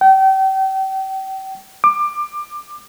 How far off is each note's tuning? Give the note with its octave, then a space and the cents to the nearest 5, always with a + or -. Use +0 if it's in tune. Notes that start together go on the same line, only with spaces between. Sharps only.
G5 -35
D6 +25